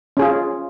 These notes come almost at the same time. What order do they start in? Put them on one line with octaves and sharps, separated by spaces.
C#4 G#4 F4